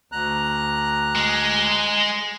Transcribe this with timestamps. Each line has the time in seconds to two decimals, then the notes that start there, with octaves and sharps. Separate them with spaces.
0.12 D2 A#5 F#6
1.16 G#3